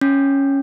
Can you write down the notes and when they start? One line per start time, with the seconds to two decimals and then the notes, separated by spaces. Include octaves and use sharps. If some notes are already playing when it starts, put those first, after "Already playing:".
0.01 C#4